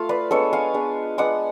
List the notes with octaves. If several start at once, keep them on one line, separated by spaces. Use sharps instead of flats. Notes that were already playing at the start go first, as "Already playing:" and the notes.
Already playing: A3 F4 F5
B4 D5
G#3 B3 D4 A4 C#5
F5 G#5
G#3 B3 D4
G#3 B3 D4 D5 F#5